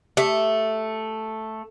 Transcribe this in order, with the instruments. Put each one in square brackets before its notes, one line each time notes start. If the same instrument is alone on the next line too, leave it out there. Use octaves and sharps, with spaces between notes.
[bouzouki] A3 [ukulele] G4 E5